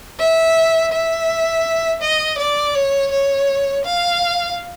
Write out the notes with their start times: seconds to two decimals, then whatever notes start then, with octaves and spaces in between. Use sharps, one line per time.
0.19 E5
0.92 E5
2.02 D#5
2.38 D5
2.75 C#5
3.11 C#5
3.85 F5